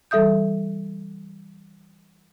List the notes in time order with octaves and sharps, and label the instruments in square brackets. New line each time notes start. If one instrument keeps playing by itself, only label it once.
[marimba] E3 G3 A4 E5 D#6 G6